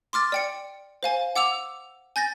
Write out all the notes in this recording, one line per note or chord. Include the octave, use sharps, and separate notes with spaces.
C6 D6 F6 A6
D5 G5 C#7
C5 F5 G#5
F#5 D6 E6 F7
G#5 G6 A6 A#6